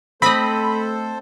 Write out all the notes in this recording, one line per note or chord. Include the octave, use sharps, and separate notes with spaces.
A3 C4 A4 C5 D#5 B5